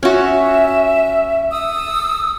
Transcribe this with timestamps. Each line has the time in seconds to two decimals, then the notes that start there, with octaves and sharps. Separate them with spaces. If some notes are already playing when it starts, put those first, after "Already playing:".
0.03 C#4 F#4 E5
1.50 D#6 E6